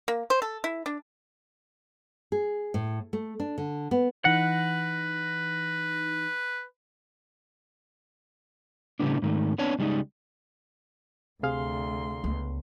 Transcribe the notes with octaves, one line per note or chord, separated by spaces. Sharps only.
A#3
C5
A4
E4
D4
G#4
A2
A3
D4
D3
B3
E3 D#4 B4 F#5 A#6
A2 C#3 G3 G#3 B3 D4
G#2 D#3 A3
B3 C4 D4 C#5 A5
C#2 G3 G#3 D#4
D2 C3 G#4 F5 C6
C#2 B3